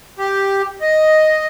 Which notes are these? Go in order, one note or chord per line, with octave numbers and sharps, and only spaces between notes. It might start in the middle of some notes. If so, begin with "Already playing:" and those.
G4
D#5